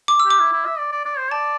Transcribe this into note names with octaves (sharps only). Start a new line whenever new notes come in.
D6
E6
G4 D6
E4
E4
E5
D5
D5
D5
C5
D5 A5